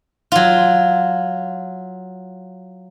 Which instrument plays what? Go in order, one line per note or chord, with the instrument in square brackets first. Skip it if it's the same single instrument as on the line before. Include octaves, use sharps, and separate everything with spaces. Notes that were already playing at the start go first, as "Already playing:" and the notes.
[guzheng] F#3 F4